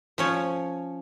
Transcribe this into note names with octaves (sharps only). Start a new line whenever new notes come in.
F3 C#4 C#5